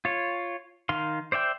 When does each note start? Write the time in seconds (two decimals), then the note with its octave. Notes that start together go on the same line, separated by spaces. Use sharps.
0.05 F4 C#5
0.89 D#3 F5 C6
1.32 C5 D5 E5 G5